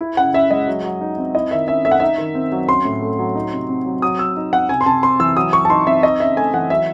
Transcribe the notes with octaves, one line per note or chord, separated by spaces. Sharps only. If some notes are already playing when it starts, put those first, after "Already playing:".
E4
C#3 F#5
C#4 E5
G#3 D#5
F#3
F#3
D#4
C4
E4 D#5
D#3 E5
C#4 E5
A3 E5
F#5
D#4 E5
D#3
C4
F#3
C#4 C6
A2
A3
F#3
D#4
C3
C4
F#3
F#3 D#6
F#3 E6
D#4
C4 F#5
C3 G#5
C6
C3 A5
C4 C6
E3 E6
F#3 D#6
F#3 C#6
A5
D#4 C6
C4 E5
D#4 D#5
C#3 E5
A3 G#5
E3 F#5
F#3 E5